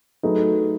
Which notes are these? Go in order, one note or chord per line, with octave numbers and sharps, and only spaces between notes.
F#3 A3 D#4 G#4 B4